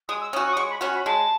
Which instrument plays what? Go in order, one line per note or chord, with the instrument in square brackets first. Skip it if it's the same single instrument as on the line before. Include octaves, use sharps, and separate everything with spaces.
[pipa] G#3 [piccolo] D#6
[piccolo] E6
[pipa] C#4 F#4 [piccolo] D#6
[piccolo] C#6
D#6
[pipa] G#3 [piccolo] C#6
[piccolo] B5
[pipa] C#4 F#4 [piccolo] C#6
[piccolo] B5
[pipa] G#3 [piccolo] A5